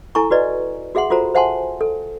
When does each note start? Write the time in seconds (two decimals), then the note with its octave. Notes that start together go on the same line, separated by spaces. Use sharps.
0.15 E4 A4 G#5 A#5 C#6
0.31 F#4 B4 D5 D#5
0.95 F#4 G#4 E5 F#5 C6
1.10 F4 F#4 A4 C5 A#5
1.35 C5 E5 F#5 G#5 A5 C6
1.81 A4